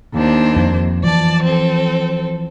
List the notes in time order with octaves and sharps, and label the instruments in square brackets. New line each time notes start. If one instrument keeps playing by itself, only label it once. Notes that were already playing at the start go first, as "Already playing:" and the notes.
[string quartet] D#2 D4 C5
[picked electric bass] F2
[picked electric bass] E3 F3 [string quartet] D5 A5
[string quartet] C4 A4